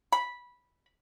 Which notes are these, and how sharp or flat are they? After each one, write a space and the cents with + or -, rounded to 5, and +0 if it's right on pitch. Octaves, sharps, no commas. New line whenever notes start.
B5 -10